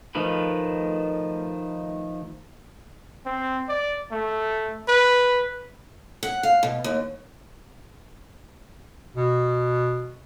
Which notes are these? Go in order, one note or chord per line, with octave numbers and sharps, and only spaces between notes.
D#3 F3 A3 B4
C4
D5
A3
B4
F#5
F5
B2
D#2
B2